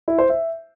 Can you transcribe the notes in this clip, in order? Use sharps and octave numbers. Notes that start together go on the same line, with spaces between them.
E4
C5
E5